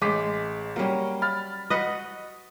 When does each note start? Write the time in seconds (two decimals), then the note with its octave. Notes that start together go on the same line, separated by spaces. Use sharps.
0.02 A1 G#3 D6 B6
0.76 F#3 G3 A#3 C#4
1.22 B5 F6 A6
1.70 F#4 B4 D#5 D#6